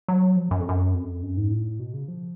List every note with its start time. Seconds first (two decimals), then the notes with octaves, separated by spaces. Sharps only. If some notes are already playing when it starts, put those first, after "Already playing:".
0.08 F#3
0.36 F3
0.51 F#2
0.60 F2
0.69 F#2
0.94 F2
1.23 F#2
1.37 G#2
1.51 A2
1.79 B2
1.94 C#3
2.08 F3